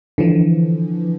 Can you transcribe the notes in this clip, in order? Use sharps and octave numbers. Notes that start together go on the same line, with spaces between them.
D3 E3 F3